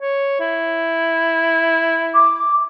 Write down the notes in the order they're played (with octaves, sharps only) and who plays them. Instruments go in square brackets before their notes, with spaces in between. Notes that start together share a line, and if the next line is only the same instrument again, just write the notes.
[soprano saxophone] C#5
E4
[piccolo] D6